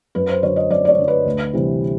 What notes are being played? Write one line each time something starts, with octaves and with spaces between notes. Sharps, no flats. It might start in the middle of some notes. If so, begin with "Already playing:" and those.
F#2 B4
C5
D3 F#3 C#5
D#5
F#2 D5
D5
C#5
D3 F#3
B4
D2
C3 E3 G3